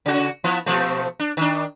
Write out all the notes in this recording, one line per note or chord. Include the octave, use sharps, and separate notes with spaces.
C#3 F#4
F3 B3 E4
B2 F3 A3
D4
D#3 D4